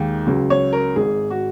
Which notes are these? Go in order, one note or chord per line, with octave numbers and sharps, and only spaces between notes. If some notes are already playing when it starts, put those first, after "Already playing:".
Already playing: D#2 D#3 G#3
C#2 C#3 F#3
C#5
A#4
G#1 G#2 G#3 G#4
F#4